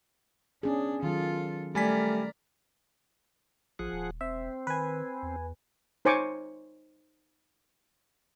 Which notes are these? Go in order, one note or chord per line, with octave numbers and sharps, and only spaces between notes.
B3 C#4 D4 G#4
D#3 F#3 F4 A4
G3 A3 A#4 D5 G#5 B6
A1 F3 G#4 F#5
D#1
E1 C4 E5
D#3 B4 G#5
E2
D#4 C5 C#5 G#5 C#6 D6